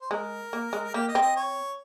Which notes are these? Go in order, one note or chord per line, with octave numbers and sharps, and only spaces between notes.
C5
G#3 A#4
A#3
G#3
A#3 G4
D#5
C4
D#5
C#5